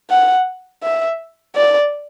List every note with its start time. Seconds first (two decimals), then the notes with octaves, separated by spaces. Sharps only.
0.10 F#5
0.83 E5
1.56 D5